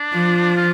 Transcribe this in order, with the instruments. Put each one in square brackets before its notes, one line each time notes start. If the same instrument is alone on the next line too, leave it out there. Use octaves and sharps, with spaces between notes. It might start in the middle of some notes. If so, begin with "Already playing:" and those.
Already playing: [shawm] D4
[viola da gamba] F3
[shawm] F4